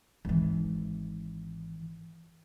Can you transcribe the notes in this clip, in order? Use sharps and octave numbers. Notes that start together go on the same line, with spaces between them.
G#1 E3